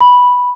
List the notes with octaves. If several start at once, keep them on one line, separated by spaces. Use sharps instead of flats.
B5